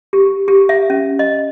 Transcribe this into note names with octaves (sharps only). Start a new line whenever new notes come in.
G4
G4
E5
C#4
D#5